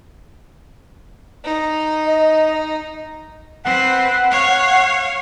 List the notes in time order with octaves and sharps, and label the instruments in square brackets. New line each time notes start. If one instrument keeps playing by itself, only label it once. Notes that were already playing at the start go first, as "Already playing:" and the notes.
[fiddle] D#4
[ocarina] D#5
[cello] C4 B4 [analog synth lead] F#5
[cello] C#5 F5